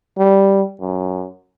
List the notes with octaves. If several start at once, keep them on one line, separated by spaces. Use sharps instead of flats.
G3
F#2